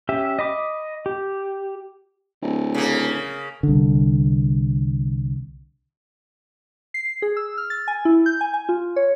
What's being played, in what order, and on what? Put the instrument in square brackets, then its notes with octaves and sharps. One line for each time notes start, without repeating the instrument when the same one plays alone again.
[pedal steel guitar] C#4 G4 E5
D#5 B5 D6
G4
[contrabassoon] D1
[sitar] C#3 A#3
[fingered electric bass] C2 D3
[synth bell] C7
G#4
E6
F6
A6
G#5
E4
G6
G#5
G#5
F4
C#5